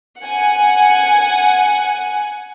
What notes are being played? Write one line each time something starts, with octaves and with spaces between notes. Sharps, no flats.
F#5 G#5